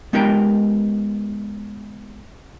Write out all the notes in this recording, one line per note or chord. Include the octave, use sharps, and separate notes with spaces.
G#3 B3 D#4 G4 A#4 G5